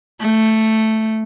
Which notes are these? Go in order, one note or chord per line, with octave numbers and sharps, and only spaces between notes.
A3